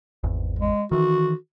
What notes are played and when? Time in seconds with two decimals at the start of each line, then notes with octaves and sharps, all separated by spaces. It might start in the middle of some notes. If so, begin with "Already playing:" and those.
0.24 G#1 E2
0.59 G#3
0.92 D#3 E3 F#4